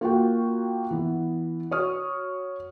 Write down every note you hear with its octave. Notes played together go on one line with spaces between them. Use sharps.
A#3 F4 F#4 G5
E3 B3
F#4 C#5 C#6 D#6 F6